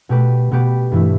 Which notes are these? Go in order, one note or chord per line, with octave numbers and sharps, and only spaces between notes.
B2 A3 G4 B4
B2 B3 G4 B4
G2 E3 A3 E4